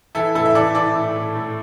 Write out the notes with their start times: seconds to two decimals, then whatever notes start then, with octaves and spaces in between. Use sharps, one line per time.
0.15 E3 E4 A4
0.35 A2 E4 A4
0.46 E5
0.55 E3 A4 D5
0.75 E3 A4 D5
0.95 A2
1.16 A2
1.35 A2